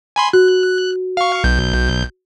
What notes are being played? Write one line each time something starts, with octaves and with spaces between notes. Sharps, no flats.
G#5 B5 C6
F#4 F#6
F5 C#6
B1 G6